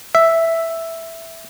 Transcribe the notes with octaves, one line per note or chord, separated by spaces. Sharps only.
E5